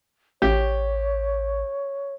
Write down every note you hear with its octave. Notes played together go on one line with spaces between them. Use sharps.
A1 G4 C#5